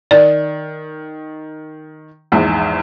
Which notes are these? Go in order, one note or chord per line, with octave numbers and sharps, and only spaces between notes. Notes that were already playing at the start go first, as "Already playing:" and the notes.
D#3 D5
A#1 E2 G#2